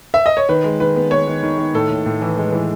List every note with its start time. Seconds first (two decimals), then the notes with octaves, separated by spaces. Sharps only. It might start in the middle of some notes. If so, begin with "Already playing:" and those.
0.14 E5
0.26 D#5
0.37 C#5
0.49 D#3 B4
0.64 G#3
0.80 D#3 B4
0.96 B3
1.11 B3 C#5
1.27 D#3
1.43 D#3
1.58 D#3
1.74 A2 A4
1.90 A2
2.06 A2
2.22 E3
2.37 G#3
2.52 E3